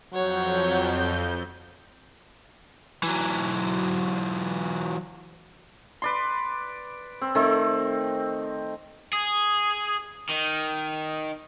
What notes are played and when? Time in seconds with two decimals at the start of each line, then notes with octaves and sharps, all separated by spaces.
0.14 F2 F#3 C#5 F#5 G6
3.03 E3 F#3
6.02 B4 D5 C6
7.21 C4
7.35 D#3 A3 C4
9.13 G#4
10.29 D#3